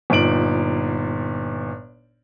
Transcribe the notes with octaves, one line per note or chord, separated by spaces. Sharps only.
G1 A#2 D#4 D7 F#7